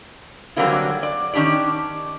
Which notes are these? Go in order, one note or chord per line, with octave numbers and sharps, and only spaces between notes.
D3 F#3 G3 A#3 C4 E4
D5
D#3 C#4 D4 G4 D5